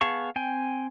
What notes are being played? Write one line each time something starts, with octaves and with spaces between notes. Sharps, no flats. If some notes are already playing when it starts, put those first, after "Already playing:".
B3 G#4 F5 A5 C#6
C4 G5 G#5